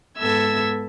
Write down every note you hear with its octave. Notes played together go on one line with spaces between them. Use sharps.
G#2 B3 A4 E5 E6 G#6